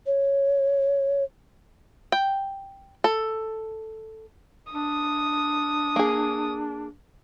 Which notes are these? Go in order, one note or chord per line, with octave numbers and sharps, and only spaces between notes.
C#5
G5
A4
D4 D#6
A#3 G#4